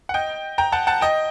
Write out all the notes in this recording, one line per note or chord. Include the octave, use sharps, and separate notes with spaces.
F#5
D#5 G5
G5 A#5
F#5 A5
F#5 A5
D#5 G5